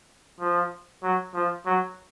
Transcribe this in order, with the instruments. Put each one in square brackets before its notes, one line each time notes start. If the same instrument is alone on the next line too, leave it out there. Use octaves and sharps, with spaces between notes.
[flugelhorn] F3
F#3
F3
F#3